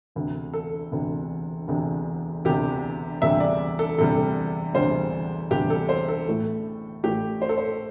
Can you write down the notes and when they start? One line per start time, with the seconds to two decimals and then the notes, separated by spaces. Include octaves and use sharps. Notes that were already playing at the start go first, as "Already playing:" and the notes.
0.15 E1 D2 C3
0.53 A4
0.92 E1 D2 C3
1.68 E1 D2 C3
2.45 E1 D2 C3 G4
3.21 E1 D2 C3 G3 E5
3.40 D5
3.79 A4
3.98 E1 D2 C3 G3 A4
4.74 E1 D2 C3 G3 C5
5.50 E1 D2 C3 G3 G4
5.70 A4
5.89 C5
6.08 A4
6.27 A1 A2 A3
7.04 A1 A2 A3 G4
7.42 C5
7.49 A4
7.58 C5